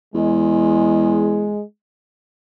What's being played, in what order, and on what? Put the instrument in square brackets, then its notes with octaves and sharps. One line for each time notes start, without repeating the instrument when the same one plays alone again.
[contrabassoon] E2 [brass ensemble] G#3